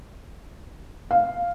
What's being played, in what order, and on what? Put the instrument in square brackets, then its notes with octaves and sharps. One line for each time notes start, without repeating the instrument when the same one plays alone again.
[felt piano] F5